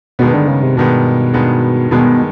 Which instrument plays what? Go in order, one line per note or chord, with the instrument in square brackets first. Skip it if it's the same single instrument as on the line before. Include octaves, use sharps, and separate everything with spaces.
[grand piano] G2 D#3 G#3 B3 [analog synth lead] B2
[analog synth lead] D3
C#3
C3
[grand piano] G2 D#3 G#3 B3 [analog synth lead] B2
[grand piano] G2 D#3 G#3 B3
[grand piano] G2 D#3 G#3 B3 [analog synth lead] B2